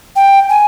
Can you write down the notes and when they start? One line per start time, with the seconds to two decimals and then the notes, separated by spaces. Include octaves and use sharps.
0.16 G5
0.49 G#5